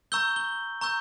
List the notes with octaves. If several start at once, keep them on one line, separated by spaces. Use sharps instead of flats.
A#5 C#6 E6 G6 G7
G7
A#5 C#6 E6 G6